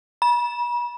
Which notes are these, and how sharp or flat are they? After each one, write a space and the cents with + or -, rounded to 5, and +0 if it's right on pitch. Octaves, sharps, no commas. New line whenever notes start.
B5 -40